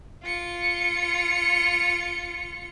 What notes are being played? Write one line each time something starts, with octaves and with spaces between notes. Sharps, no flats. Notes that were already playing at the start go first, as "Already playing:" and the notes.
F4 C#7